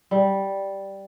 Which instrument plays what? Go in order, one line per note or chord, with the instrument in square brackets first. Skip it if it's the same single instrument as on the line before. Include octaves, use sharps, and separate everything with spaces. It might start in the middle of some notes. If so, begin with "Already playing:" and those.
[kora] G3